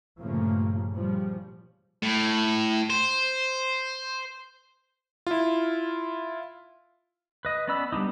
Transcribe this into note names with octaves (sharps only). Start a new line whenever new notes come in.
G2 A#2 C#3 F3 A3 A#3
A#2 C#3 F3 G3
A2
C5
E4 F4
B4 D#5
B3 C#4 D5 B5 E6
G3 B3 D4 D#4